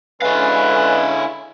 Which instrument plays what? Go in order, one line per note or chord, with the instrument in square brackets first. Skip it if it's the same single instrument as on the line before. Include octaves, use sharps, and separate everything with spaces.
[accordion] D3 G#3 C#4 [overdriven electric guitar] E4 F5 [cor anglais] B4